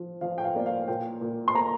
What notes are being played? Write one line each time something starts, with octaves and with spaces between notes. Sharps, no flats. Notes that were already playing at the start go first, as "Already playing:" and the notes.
Already playing: F3
F3 F5
G5
F5
A#3 D5
F5
A#2 G5
A#2
C6
A#3 A#5